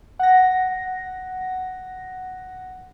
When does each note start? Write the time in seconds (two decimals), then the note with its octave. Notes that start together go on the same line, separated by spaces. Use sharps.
0.19 F#5 A#6